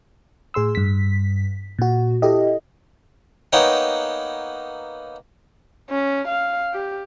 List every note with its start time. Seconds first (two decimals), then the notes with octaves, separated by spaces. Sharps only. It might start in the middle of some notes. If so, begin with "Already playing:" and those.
0.54 A2 G#4 C6 E6
0.75 G2 B6
1.79 A#2 F#4
2.22 E4 G4 A4 D#5
3.53 A#3 B3 D#4 C#5 G5
5.90 C#4
6.28 F5
6.73 G4